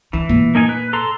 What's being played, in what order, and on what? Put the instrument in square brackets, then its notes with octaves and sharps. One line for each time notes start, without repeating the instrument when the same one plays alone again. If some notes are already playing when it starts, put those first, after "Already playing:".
[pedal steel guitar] E3 [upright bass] D4
[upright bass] A#2
[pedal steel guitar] A#3 D#4 G#5
B4
A4 A#5 C6